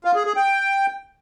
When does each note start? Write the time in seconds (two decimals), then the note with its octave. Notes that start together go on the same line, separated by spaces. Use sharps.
0.04 F4
0.15 G#4
0.26 G#4
0.36 G5